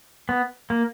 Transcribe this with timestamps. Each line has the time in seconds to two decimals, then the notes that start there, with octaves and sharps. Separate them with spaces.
0.29 B3
0.70 A#3